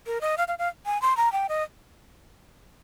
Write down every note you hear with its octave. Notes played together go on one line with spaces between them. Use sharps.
A#4
D#5
F5
F5
F5
G#5
C6
A#5
G5
D#5